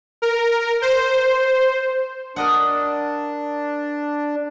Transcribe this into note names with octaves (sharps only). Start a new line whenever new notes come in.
A#4
C5
D4 A#4 D#5 F#5